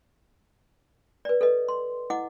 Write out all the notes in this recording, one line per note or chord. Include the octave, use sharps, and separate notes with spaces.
B4 D5
A4 B4 D#5
C6
E4 D#5 F#5 D6